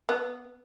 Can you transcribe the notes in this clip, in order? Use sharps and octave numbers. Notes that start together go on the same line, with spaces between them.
B3